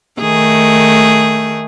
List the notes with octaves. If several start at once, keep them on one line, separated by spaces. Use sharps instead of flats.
D#3 A3 G#4